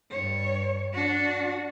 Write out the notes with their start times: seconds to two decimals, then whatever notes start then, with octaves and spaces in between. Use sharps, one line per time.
0.10 G2 C#5
0.93 D4 F#4